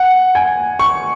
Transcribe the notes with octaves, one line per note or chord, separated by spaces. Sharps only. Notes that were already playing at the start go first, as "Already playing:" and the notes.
Already playing: F#5
G#5
C#6